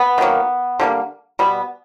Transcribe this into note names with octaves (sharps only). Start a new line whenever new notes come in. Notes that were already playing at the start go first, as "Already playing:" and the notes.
Already playing: B3
D#3 F#3 A#3
D3 G3 A#3
B2 G3 B3